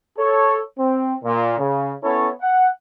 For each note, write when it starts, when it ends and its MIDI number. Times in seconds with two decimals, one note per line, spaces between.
0.18 0.59 69
0.18 0.59 73
0.79 1.14 60
1.24 1.55 46
1.59 1.92 49
2.04 2.29 59
2.04 2.29 61
2.04 2.29 64
2.04 2.29 69
2.04 2.29 73
2.42 2.67 78